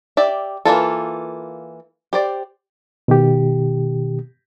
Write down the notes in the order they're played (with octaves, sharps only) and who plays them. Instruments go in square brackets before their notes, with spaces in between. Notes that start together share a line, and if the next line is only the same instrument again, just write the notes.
[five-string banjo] G4 D5 E5
E3 A#3 F4 A4
G4 C5 D5
[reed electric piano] B2 D#3 G4